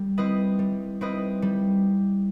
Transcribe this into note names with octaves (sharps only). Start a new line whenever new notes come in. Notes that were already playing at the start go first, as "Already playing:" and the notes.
Already playing: G3
C4 E4 B4 D#5
G3
C4 E4 B4 D#5
G3